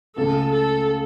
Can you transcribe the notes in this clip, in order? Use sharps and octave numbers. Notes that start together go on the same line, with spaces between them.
C#2 C#3 A3 A4
A4